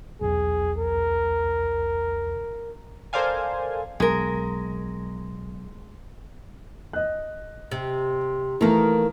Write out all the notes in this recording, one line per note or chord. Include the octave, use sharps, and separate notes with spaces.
B1 E2 G#4
A#4
A4 A#4 C5 D5 F5 G#5
B1 G#3 A#4
D#5 F#6
C3
D#3 E3 A3 A#3